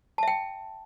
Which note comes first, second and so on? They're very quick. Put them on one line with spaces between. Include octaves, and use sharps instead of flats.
A5 E5 G5